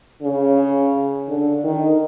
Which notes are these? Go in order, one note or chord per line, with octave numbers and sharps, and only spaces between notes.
C#3
D3
D#3